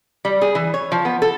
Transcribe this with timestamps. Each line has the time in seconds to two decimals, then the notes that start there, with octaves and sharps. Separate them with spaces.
0.25 G3
0.41 G#4
0.55 E3
0.74 C#5
0.92 F3
1.05 B3
1.22 A4